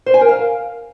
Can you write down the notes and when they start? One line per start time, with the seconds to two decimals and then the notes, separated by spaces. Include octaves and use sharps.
0.06 C5
0.14 G#5
0.21 A#4
0.29 F5